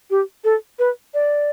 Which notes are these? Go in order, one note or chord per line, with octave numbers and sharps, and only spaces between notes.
G4
A4
B4
D5